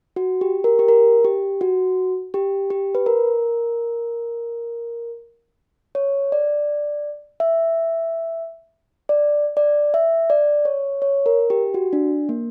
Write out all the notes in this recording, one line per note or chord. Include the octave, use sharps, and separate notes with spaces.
F#4
G4
A#4
G4
A#4
G4
F#4
G4
G4
B4
A#4
C#5
D5
E5
D5
D5
E5
D5
C#5
C#5
A#4
G4
F#4
D4
A#3